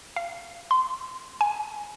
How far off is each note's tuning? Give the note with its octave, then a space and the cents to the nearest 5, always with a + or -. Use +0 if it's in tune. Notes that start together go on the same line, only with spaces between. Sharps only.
F5 -20
C6 -25
G#5 +5